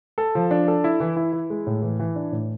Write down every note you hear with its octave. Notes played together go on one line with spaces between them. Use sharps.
A4
F3
D4
A4
E4
E3
E4
E4
G#3
A2
E3
E3
D4
A2